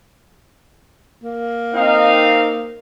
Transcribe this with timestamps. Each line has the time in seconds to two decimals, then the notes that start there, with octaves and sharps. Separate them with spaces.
1.24 A#3
1.74 C4 D#4 F5